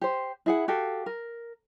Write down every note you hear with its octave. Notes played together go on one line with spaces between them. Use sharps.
G4 C5
E4 G#4 F#5
F#4 G4 A4 F5
A#4